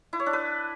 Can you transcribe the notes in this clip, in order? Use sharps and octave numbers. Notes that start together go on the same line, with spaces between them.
E4
C#5
D4
B4